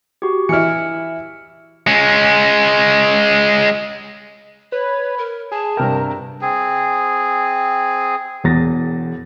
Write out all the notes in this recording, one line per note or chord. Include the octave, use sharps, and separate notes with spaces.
F#4 G4
E3 E4 F6 C#7
G#3 C#4
B4 C#5
A#4
G#4 A5
G2 C3 A#4 G5
C4 G#4
E1 E2 A6 A#6